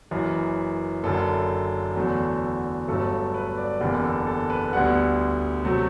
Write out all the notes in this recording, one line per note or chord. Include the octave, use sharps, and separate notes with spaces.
F#1 F#2 E3
F#1 F#2 D3 A4
E2 D3 F#3 A3
G1 G2 F#3 A3 A4
B4
D5
F#1 E2 D3 G4
A4
A4
B4
D2 D3 G3 B3 F#5
C3 F#3 A3